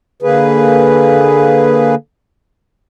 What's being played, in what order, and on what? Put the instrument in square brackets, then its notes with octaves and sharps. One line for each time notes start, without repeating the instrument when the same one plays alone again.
[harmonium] D3 A#3 G#4 B4